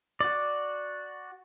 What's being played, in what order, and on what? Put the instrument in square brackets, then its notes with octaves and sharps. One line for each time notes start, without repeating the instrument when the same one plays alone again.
[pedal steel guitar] F#4 D5